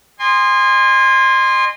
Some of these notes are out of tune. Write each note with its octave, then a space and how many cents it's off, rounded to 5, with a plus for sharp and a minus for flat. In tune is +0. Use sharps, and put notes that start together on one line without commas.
D#5 -25 G#5 -35 C6 +0